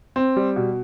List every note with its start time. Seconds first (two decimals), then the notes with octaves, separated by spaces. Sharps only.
0.16 C4
0.36 G3
0.56 B2